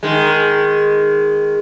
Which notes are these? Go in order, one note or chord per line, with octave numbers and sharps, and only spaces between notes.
D#3 G#3